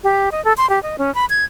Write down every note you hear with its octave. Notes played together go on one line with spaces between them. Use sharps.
G4
D#5
A4
C6
G4
D#5
C#4
B5
G#6